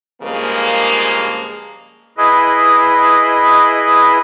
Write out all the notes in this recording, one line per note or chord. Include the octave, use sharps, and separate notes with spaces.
G2 C#3 F3 G#3 A#3
E4 G#4 B4 D#5